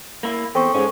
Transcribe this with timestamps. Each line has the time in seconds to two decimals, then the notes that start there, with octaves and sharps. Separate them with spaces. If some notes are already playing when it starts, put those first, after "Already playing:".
0.23 A#3 E4
0.55 E2 C4 A4 C#6
0.74 G#2 G#3 C#4